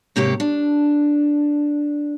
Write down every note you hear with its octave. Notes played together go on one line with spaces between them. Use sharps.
G#2 C3 A#3 G4 C#5
D4